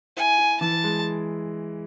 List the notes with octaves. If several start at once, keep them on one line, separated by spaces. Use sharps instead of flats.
E4 G#5
E4
E3 A5
G#3